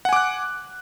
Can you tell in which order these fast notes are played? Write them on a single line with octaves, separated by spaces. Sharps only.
F#5 G#5 D6 F#6